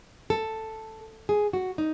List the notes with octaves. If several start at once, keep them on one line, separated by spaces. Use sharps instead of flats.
A4
G#4
F#4
D#4